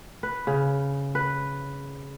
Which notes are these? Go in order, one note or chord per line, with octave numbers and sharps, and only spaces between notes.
B4
C#3
B4